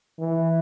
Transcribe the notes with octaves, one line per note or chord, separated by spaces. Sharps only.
E3